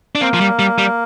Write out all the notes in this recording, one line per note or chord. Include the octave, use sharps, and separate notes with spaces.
D4
A#3 C4
F3
G3
G3
G3